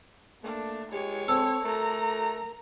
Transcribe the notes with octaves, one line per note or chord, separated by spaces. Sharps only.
A3 A#3 D4
G#3 G4 C#5
C4 A4
A3 A#4 A#5